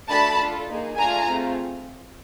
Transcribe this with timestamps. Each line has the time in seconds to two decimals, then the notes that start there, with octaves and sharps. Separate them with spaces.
0.09 A3 D4 F#4 A4 A5 B5
0.39 D4 F4 A4
0.68 A#3 D#4 G#4
0.97 A3 D4 F4 G#4 G#5 A#5
1.26 A3 C4 F4 G#4